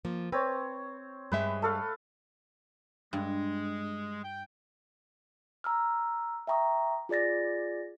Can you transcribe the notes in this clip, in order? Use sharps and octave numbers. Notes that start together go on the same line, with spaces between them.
F3 A#3
C4 B4 C#5
G2 G#3 B4 E5
A3 A4 F5
G2 G#3
G5
A#5 E6 F6
E5 G5 A#5 C#6 D#6
F4 G#4 D5 A6 A#6